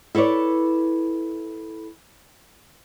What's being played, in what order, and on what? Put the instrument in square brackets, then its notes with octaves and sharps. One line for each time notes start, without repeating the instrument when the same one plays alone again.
[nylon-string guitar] E4 A4 B4 C#5 D5